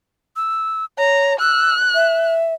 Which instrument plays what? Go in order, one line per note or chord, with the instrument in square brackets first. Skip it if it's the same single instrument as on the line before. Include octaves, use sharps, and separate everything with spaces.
[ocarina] E6
[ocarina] C#5 [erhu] A#5
[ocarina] E6 [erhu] F#6
[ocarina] E5